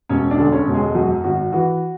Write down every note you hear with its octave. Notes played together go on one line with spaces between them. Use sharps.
E1 C#4 C#5
D4 D5
D2
C#4 C#5
E1
G#3 G#4
F#2 F#4
G#1 F#4
E3 F#4